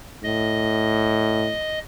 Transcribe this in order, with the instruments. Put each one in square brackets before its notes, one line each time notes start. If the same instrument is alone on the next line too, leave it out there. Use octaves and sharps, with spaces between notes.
[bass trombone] A2 [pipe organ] D#5